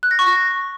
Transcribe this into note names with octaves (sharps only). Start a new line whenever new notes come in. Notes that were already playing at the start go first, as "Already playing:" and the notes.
F#6
A#6
C#6
A#6